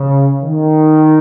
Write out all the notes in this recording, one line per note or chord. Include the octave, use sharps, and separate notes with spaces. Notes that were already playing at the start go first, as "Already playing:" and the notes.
Already playing: C#3
D#3